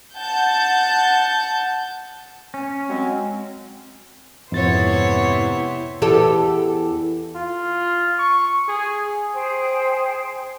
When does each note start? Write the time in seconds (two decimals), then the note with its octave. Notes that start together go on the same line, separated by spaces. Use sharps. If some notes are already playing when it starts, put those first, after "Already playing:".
0.18 F#5 A5 G6
2.54 C#4
2.88 F#3 G#3 C4
4.52 F2 G#2 C3 B3 E4 C5 C#5 A6
6.02 E2 G4 A4
7.35 F4
8.18 C#6
8.68 G#4
9.33 G#4 C5 G5